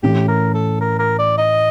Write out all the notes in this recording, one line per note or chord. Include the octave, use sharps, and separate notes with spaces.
A2 E3 A3 C#4 E4 G4
A#4
A4
A#4
A#4
D5
D#5